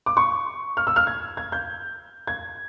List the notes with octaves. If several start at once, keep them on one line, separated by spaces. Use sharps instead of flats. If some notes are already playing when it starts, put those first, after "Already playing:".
D6
C#6
F6
E6
F6
G#6
G#6
G6
G#6